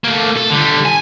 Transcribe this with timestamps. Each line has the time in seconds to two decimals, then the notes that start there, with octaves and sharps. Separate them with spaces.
0.04 A3 A#3
0.37 A4
0.50 D3 G3
0.85 G#5